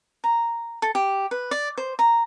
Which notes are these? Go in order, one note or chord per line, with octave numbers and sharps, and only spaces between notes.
A#5
A4
G4
B4
D5
C5
A#5